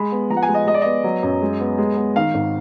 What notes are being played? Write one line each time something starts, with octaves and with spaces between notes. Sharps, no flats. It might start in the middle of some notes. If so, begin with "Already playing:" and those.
Already playing: G#3 B5
B3
F3 A#5
F#5
G#5
G#3
D#5
G#3 D#5
D5
B3 D#5
F#3
F#2
G#3
B3
G#3
B3
D#3 F5
G#1